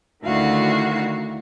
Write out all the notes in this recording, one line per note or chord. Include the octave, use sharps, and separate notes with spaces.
D2 D#3 E4 F#4 F5